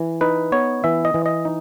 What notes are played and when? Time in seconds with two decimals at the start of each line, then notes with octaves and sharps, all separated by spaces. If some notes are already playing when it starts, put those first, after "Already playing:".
Already playing: E3
0.21 D#4 B4
0.52 B3 C#5
0.84 E3 E5
1.05 D#5
1.14 E3
1.26 D#5
1.45 D#4